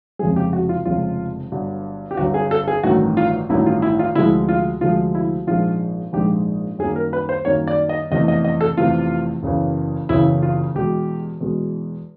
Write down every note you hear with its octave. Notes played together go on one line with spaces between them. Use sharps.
F1 F2 C#3 F3 G#3 G#4
G4
F#4
F4
F1 F2 C#3 F3 G#3 F4
G1 G2 D3 F#3
G4
G1 G2 D3 F#3 F#4
G#4
A4
G#4
A1 G2 D#3 F#3 A3 F#4
F4
A1 G2 D#3 F#3 A3 E4
F4
E4
F4
D2 C3 F3 G#3 E4
F4
D2 C3 F3 G#3 F4
E4
A#1 G#2 F3 G#3 F4
A#1 G#2 F3 G#3 G4
F#2 D#3 G3 A#3 G#4
A#4
B4
C5
F#2 D#3 G3 A#3 C#5
D5
D#5
F1 E2 C3 E3 A3 D#5
D#5
D#5
A4
F1 E2 C3 E3 A3 F4
F#1 E2 C#3 E3
F#1 E2 C#3 E3 E4
F4
E2 B2 G#3 G4
E2 B2 G#3